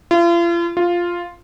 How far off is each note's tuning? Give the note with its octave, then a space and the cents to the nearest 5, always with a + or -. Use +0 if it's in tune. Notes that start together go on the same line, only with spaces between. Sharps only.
F4 -40
F4 +0